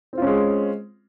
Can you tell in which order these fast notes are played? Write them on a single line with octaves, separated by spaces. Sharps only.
C4 F4 C#4 G#3